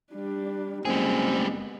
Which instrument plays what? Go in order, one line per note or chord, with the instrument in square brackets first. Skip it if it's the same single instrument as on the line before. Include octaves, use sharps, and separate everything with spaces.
[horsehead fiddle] G3 D4
[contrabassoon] F#1 [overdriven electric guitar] G3 G#4 [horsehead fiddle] G#3 B3 [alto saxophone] C4